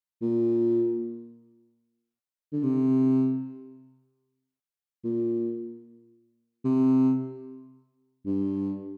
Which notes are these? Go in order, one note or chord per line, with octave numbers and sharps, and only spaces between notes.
A#2
D3
C3
A#2
C3
G2